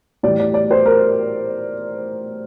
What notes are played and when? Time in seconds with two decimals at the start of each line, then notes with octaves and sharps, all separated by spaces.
0.23 A2 E3 G3 D5
0.40 D5
0.54 D5
0.71 C5
0.86 A#4